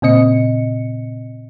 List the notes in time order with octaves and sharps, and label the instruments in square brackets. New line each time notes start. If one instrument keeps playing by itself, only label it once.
[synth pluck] A#2 C#3 C4 D#5 C#7